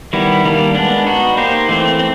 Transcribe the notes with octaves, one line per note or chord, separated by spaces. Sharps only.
D#3 G3 B3 E4
D#3 G3 A#3 D4
G#3 B3 D4
B3 D#4 F#4
A#3 D#4 G4 C5
E3 A3 C4
C4